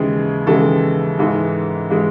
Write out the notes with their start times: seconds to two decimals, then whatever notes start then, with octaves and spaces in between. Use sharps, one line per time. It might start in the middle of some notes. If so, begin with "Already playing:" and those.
Already playing: D#2 C#3 E3 G#3
0.47 D#2 C#3 E3 G#3 A4
1.19 G#2 E3 G#3
1.91 E3 G#3